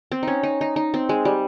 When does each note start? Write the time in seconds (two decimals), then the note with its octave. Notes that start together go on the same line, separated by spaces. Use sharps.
0.12 C4
0.23 C#4 D#4
0.43 D#4
0.61 D#4
0.76 D#4
0.94 C4
1.09 G#3
1.25 G3